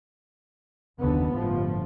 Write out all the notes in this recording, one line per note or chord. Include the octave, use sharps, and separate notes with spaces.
F#1 D#2 D3 B3
G1 A2 F3